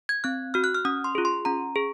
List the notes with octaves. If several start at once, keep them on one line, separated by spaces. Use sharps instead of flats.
G#6
C4 F#6
F#4 F6
F#6
F6
C#4 D#6
C6
F4 G#4
C6
C#4 A#5
G#4